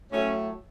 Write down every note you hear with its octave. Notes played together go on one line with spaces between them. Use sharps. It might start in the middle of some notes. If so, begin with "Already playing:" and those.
A2 F#3 A3 C#4